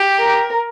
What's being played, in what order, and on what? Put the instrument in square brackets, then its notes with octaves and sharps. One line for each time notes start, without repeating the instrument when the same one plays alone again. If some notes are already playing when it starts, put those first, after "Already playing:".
Already playing: [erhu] G4
[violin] A#4